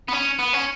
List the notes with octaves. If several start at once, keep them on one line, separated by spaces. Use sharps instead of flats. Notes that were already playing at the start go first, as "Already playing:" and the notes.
B3
C#4
B3
C#4